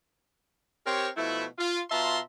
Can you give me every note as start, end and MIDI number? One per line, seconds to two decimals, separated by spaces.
0.85 1.08 60
0.85 1.08 67
0.85 1.08 70
0.85 1.08 72
0.85 1.08 73
1.16 1.44 47
1.16 1.44 53
1.16 1.44 57
1.16 1.44 64
1.58 1.80 65
1.90 2.18 47
1.90 2.18 65
1.90 2.18 76
1.90 2.18 81
1.90 2.18 82
1.90 2.18 84